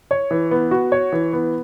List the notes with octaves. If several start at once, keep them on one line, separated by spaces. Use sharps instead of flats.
C#5
E3
B3
F#4
C#5
E3
B3